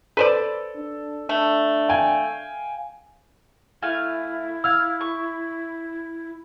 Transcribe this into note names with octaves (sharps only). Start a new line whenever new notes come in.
A4 B4 C5 D5
D4
A3 D4
F5 G5 G#5
A3 E4 F5 G#5
F5 E6 F6 G#6
C#6